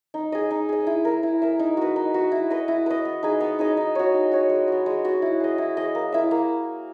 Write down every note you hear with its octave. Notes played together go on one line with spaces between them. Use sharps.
D#4
G#4 D#5
D#4
G#4 D#5
E4
A#4 E5
E4
A#4 E5
D#4
F#4 B4
D#4
F#4 B4
E4
B4 D#5
E4
B4 D#5
B3
D#4 G#4 D#5
B3
D#4 G#4 D#5
D#4
F#4 C#5
D#4
F#4 C#5
G#3
B3 F#4
G#3
B3 F#4
E4
G#4 D#5
E4
G#4 D#5
A#3
E4 A#4 E5
A#3